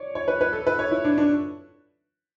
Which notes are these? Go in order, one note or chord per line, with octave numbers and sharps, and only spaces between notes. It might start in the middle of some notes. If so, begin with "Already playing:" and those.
Already playing: C#5 D5
C#5
B4
B4
A4
B4
C#5
E4
D4
D4